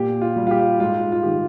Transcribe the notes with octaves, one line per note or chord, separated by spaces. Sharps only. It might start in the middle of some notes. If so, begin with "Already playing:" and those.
Already playing: A#2 G4
F4
G3
F4
G4
G#2 F4
F4
D#3 G3 G4